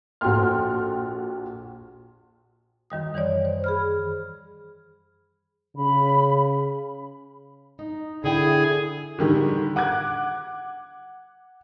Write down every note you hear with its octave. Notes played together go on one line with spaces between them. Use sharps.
A#1 F#4 A4 G5 C6 F6
F#2 D#3 G3 D#6
D#3 E3 G3 C#5 D5
C5
G#4 B5 F6
C#3 B5
D#4
D3 E4 G#4 G5
D3 D#3 G3 G#4
F#5 D6 F#6 G#6